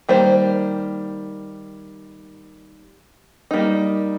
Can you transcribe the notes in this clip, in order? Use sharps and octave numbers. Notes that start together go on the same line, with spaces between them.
D#3 G3 A#3 C5
G3 A#3 D#4